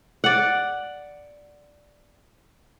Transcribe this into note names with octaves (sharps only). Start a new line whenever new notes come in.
D5 F#5